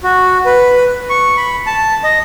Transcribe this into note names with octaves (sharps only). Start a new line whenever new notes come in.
F#4
B4
C#6
B5
A5
D#5